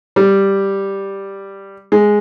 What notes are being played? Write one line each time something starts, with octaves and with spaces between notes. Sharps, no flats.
G3
G#3